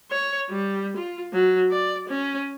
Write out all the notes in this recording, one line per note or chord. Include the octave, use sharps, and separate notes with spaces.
C#5
G3
F4
F#3
D5
C#4